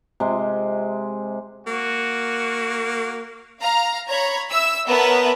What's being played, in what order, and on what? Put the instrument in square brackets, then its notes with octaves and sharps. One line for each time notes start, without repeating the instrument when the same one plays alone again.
[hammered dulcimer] C3 G#3
[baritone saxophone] A#3 [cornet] F#4
[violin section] F5 A#5
C#5 A#5 B5 G#6
E5 E6
B3 A#4 B4 C#5 E5 A5